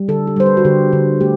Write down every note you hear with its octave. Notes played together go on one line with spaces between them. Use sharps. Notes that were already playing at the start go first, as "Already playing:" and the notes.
Already playing: G3
D3 A4
G4
G3 C5
B4
F#4
D3 G4
D3
A3 G4